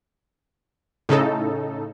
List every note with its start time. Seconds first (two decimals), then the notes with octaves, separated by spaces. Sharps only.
1.09 A2 C#3 D#4 A4